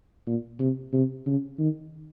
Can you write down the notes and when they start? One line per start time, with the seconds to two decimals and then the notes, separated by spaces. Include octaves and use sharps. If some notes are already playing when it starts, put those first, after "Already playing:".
0.27 A#2
0.59 C3
0.93 C3
1.26 C#3
1.59 D#3